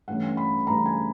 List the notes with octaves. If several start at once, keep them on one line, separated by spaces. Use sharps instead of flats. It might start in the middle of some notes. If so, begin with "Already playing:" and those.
G2 E3 A3 C#4 F#5
B5
G2 E3 A3 C#4 A#5
G#5